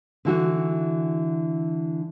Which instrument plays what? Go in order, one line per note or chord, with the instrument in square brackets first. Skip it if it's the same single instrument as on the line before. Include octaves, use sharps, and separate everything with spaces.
[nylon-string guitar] D3 E3 F#4